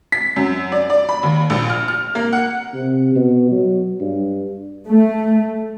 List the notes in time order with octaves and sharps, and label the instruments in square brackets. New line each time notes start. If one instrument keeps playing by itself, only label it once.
[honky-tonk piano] B6
F#2
D5
D5
B5
D#2
A#1
F6
F6
A#3
F#5
[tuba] C3
B2
F#3
G2
[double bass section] A3